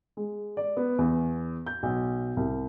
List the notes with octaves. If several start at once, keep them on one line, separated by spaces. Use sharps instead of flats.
G#3
D5
B3
E2
G6
B1
C2